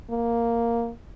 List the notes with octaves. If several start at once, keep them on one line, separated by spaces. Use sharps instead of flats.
A#3